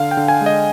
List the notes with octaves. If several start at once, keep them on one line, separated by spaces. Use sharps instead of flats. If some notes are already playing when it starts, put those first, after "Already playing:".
Already playing: D3 F5
G5
D3
G#5
G#3
D#5